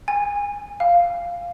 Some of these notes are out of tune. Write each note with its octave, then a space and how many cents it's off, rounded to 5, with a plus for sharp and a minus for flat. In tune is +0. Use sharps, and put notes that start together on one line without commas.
G#5 -25
F5 -5